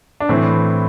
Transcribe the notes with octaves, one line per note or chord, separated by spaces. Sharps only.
D4
A2 E3 C4